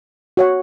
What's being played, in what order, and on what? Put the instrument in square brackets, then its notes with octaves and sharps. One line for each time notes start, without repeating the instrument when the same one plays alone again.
[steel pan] F#4 C#5 F#5